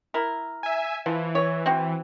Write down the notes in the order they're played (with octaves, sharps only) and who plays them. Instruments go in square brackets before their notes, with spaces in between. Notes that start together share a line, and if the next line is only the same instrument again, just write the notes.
[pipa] E4 A#4
[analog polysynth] E5 G#5
[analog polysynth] E3 [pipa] F3
[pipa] C#5
C4 F#4